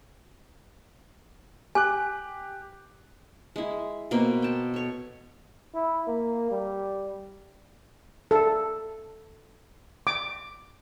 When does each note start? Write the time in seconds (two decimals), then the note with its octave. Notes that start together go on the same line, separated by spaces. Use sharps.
1.75 G4 G#5 D6 F#6
3.56 G#3 E4
4.11 B2 A#3 C4
4.42 G5 A5
4.74 A4 C#5
5.75 E4
6.07 A#3
6.51 G3
8.31 A4
10.07 D6